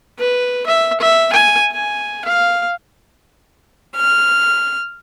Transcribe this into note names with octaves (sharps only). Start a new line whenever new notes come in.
B4
E5
E5
G#5
G#5
F5
F6